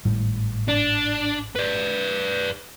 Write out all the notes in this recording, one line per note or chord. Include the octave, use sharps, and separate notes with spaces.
G#1 A2 G3
D4
B4 D5